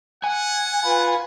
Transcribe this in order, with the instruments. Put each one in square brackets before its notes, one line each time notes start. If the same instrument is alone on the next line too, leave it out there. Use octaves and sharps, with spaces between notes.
[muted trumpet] F#5 [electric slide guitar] G#5
[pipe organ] F4 B4